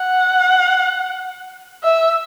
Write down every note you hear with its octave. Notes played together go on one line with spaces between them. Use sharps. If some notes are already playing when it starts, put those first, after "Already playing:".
Already playing: F#5
E5